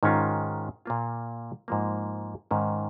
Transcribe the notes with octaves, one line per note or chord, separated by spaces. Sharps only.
G#2 D#3 G#3 C#4 F4
A#2 A#3 F4
G#2 F3 A#3
G#2 D#3 C#4